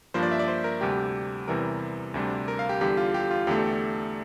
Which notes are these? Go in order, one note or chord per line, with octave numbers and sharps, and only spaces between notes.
G2 F3 A#3 D4 C5
D5
E5
D5
C5
A#4
D2 C3 G3 D4 G4
E2 C3 E3 G3 A#4
D2 C3 G3 D4
A#4
F5
G4
E2 D3 G3 G4
F4
G4
F4
E2 D3 A3 G4
G4